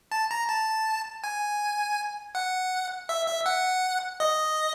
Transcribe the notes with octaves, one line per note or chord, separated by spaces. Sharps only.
A5
A#5
A5
G#5
F#5
E5
E5
F#5
D#5